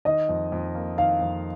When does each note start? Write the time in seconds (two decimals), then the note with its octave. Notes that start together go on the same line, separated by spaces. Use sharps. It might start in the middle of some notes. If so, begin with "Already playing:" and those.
0.05 D#3 D#5
0.29 F2
0.52 F2
0.75 A#3
0.98 D#3 F5
1.21 F2